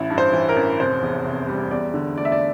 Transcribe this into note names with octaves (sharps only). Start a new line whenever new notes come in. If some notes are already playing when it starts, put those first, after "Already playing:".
Already playing: A1 E4
G2
C5
E3
A#4
A1
F1 C5
E2
C3
G3
E2 D5
D3
A3 D5
E5
D5